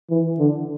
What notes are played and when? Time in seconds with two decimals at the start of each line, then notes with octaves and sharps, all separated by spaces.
0.10 E3
0.39 D3